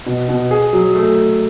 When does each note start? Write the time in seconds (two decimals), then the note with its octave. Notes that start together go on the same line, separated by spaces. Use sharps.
0.06 B2
0.29 B2
0.51 G#4
0.73 F#3
0.95 A3